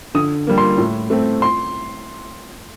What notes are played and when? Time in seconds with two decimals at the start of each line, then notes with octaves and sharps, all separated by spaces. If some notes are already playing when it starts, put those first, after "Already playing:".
0.15 D3 D#6
0.47 G3 A#3
0.58 C6
0.78 A2
1.10 A3 C4
1.42 C6